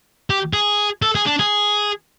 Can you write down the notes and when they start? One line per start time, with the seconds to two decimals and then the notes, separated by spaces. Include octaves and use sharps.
0.30 G4
0.53 G#4
1.02 A4
1.15 G#4
1.26 D4
1.39 G#4